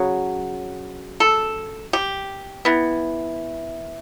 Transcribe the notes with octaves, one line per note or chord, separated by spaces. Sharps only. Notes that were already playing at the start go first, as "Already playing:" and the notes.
Already playing: C#3 F#3
A4
G4
E3 B3